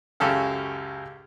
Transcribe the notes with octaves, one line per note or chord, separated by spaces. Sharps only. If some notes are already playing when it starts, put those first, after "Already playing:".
C#2 F#2 C#3 G4 A4 F5